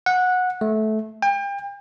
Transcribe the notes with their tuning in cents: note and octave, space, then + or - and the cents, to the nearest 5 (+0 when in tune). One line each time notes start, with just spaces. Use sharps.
F#5 -15
A3 -20
G5 +35